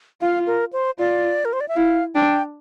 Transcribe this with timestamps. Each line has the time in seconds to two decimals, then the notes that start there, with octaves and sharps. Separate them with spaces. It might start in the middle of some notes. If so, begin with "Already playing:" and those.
0.21 F4 F5
0.47 A#4
0.73 C5
0.99 F4 D5
1.45 A#4
1.53 C5
1.61 D5
1.68 E5
1.76 E4 F5
2.15 D4 G5